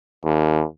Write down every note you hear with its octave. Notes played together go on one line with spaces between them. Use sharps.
D#2